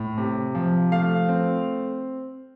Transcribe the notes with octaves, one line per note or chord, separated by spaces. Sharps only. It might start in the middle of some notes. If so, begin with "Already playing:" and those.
Already playing: A2
C3
F3
A3 F5
C4